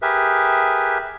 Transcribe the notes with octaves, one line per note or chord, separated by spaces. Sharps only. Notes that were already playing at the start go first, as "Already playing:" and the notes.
G4 G#4 A#4 B4 E5